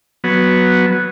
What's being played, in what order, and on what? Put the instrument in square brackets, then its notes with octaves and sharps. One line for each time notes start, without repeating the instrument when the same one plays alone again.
[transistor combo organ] F#3 B3